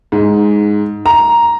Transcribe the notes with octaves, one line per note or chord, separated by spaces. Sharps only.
G#2
A#5